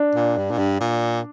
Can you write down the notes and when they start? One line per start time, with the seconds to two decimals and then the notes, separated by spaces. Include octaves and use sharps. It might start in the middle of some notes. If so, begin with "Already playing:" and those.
Already playing: D4
0.15 A#2
0.37 G2
0.51 A#2
0.59 G2
0.80 A#2